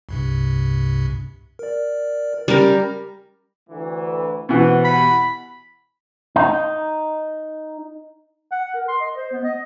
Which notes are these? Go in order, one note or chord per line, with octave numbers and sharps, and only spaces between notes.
C2 G2 C3
A#4 D5
G3 C#4 A#4 A#5 A#6
D2 E3
B2 E3 B4 C5 F#5
G4 D#5 F#5 B5
D#4
F#5
A#4
C6
D#5
C5
B3
D#5